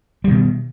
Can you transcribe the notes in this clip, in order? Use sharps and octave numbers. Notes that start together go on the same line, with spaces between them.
B2 D#3 G3